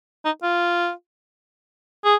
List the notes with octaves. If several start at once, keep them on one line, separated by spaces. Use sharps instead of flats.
D#4
F4
G#4